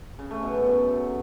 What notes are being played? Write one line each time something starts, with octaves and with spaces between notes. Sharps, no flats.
C#3
A3
B2
F#2
F#3